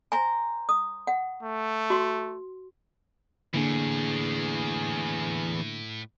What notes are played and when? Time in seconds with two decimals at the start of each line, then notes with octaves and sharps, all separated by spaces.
0.12 C5 G#5 A#5
0.69 D#6
1.07 F#5
1.43 A3
1.90 F#4 C6
3.54 A2 D3 E3 A#3 D4 G#4